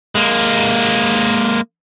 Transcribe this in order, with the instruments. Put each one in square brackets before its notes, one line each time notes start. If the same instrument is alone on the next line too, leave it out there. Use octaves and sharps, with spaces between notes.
[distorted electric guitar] G#3 A#3